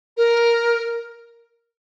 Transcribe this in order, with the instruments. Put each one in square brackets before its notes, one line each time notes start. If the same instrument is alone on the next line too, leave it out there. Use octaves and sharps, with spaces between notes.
[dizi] A#4